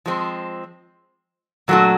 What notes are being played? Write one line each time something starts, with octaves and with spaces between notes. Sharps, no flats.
F3 G#3 C4
A#2 F#3 A3 D4 F#4